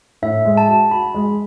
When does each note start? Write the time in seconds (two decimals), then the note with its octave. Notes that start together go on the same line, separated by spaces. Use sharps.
0.22 A2 E5
0.45 G#3
0.57 A5
0.69 F#4
0.91 F#4 B5
1.14 G#3